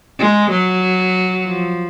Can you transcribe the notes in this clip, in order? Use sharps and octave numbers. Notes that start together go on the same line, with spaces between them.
G#3
F#3
F3